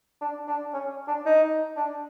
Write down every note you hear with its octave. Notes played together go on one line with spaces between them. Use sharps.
D4
D4
C#4
D4
D#4
D4